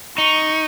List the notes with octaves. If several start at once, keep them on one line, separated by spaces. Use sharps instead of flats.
D#4 C#6